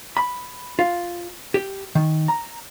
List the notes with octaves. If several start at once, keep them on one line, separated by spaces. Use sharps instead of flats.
B5
F4
G4
D#3
A#5